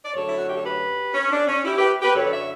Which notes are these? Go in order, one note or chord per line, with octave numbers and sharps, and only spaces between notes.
D5
F#2 D3 F#3 A3 C#4 A4 C#5
E4
F#4
G4
A4
G4 B4
C#4
D4
C#4
E4 G4
G4 B4
G4 B4
F#2 D3 F#3 A4 C#5
D5
C#5 E5